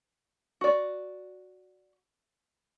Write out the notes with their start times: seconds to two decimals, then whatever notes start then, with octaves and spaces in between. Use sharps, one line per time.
0.61 F#4 D5